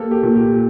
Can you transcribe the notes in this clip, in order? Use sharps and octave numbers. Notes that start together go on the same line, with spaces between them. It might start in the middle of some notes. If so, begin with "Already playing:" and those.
Already playing: A#3 G4 A4
G4
A#2
G4